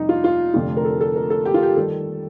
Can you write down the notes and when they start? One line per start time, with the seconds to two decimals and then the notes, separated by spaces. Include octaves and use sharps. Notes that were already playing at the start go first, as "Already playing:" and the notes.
Already playing: F2 C3 G3 D#4
0.09 F4
0.24 F4
0.54 F1 F2 D3 F3 A3 F4
0.77 A#4
0.85 A4
1.01 A4
1.16 A#4
1.30 A4
1.45 G4
1.54 F4
1.63 G4
1.76 D#3 G3 A4